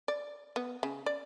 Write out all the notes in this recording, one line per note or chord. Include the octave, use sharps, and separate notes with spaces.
D5
B3
C#3
D5